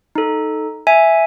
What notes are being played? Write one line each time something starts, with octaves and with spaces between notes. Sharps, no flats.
D#4 A4
E5 G#5